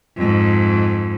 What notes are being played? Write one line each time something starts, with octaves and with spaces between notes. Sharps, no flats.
F2 G#2